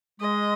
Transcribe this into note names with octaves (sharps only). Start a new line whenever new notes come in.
G#3 D#5